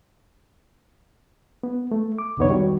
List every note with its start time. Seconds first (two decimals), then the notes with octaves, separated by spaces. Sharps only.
1.63 B3
1.92 A3
2.19 D6
2.37 C2 F2 D3 B3 D#4 C#5
2.49 D#3 G3 F#4